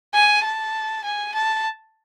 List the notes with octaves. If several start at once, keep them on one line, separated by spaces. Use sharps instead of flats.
G#5
A5
G#5
A5